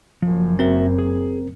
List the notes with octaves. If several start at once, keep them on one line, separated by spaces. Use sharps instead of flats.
F#1 F#2 F3
C4 F#4 A#4 E5
G#4